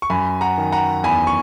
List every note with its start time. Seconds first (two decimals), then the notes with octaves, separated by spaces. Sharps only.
0.02 C#6
0.10 F#2 G#5 B5
0.41 F#5 A#5
0.58 D#3
0.72 F#5 A#5
1.04 E2 G#5 B5
1.27 C#6